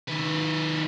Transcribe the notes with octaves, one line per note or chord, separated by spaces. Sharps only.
D#3 B4